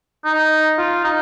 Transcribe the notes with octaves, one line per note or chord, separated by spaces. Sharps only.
D#4
F4
D#4